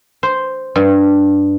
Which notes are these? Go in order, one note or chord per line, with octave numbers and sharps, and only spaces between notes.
C5
G2